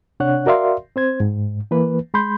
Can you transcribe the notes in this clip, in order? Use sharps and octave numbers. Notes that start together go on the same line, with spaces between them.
C3 D4 C#5 F#5 F#6
F#4 A#4 D5 E5 F5 C6
C4 C5 G#6
G#2
E3 A#3 B4
G#3 B5 C6 G6